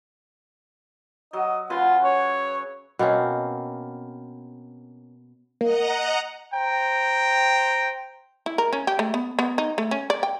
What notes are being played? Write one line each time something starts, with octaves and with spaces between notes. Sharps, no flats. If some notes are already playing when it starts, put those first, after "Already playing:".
F#3 D#5
C#3 F4 B4 F#5
C#5
B2 A#3 C4 C#4
A#3 D#5 F#5 A#5
C5 G5 A#5
E4
A#4
C#4
G4
A3
B3
B3
D#4
A3
C#4
D5
G5